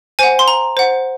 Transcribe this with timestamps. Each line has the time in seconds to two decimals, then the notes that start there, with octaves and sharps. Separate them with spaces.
0.19 C5 F#5 G#5
0.39 C6
0.48 A#5
0.77 C5 F#5